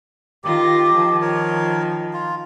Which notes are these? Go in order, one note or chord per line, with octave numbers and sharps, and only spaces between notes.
D#3 F4 G4 A#6
D#3 F3
A#4 C#5
F4